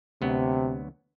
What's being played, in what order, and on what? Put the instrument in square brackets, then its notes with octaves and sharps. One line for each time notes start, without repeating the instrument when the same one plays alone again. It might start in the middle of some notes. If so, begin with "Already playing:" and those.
[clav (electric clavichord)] D2 F#3 B3 [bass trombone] C3